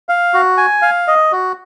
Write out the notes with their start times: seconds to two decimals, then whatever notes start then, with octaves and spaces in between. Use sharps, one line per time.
0.09 F5
0.34 F#4
0.57 G#5
0.82 F5
1.07 D#5
1.32 F#4